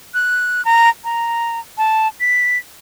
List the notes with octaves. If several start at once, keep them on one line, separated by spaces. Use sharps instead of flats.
F#6
A#5
A#5
A5
B6